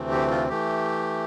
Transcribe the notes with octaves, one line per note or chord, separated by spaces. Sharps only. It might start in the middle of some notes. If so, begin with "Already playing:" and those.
Already playing: D2 C3 E3 A3 C4
G4
F4
E3 A3 G4